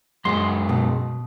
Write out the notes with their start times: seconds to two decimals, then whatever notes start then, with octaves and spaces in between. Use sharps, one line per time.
0.25 F#2 G#3 C6
0.69 B2